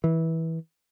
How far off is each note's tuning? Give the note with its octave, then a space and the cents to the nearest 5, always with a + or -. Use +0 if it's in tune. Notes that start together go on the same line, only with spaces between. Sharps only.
E3 -20